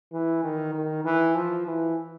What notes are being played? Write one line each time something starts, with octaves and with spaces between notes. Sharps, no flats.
E3
D#3
D#3
E3
F3
E3